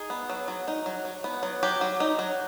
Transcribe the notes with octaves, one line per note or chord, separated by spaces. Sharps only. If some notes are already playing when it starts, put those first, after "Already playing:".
Already playing: D#4 G#4
B3
F#3
F#3
D#4
F#3
F#3
B3
F#3
F#3 G4
F#3
D#4
F#3